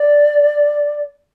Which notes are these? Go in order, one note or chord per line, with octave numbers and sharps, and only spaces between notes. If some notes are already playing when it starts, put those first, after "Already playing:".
Already playing: D5